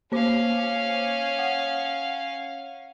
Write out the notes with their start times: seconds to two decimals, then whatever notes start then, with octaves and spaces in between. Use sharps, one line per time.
0.12 A#3 C#4 C5 F5 D6
1.39 F#5